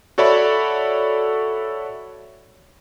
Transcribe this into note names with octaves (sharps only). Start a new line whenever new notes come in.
F#4 A4 C#5 D5 E5 B5